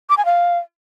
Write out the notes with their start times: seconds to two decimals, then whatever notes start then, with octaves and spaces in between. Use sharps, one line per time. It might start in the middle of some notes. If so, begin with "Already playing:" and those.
0.10 D6
0.17 G#5
0.25 F5